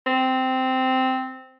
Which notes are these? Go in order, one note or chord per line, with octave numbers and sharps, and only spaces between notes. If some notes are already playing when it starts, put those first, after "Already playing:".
C4